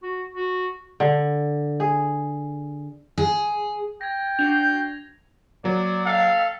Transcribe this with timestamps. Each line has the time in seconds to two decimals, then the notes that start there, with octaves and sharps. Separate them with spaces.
0.03 F#4
0.34 F#4
1.00 D3
1.80 G#4
3.18 G#4
4.01 G5 G#6 A#6
4.39 D4 F#4 G6 C7 F7
5.64 F#3 A#3 D5
6.06 A4 F5